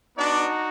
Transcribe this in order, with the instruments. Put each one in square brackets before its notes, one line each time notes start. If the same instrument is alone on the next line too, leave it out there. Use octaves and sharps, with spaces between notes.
[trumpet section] B3 D4 D#4 F#4 D5